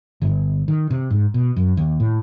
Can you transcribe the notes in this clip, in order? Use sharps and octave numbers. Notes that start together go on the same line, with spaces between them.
G1
D#3
C3
G#2
B2
F#2
D#2
A2